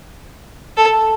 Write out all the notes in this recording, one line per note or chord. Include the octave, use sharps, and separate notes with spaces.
A4